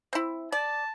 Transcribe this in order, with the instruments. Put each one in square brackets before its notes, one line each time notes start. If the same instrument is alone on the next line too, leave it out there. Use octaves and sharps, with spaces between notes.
[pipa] C4 E4
[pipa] D5 [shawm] A5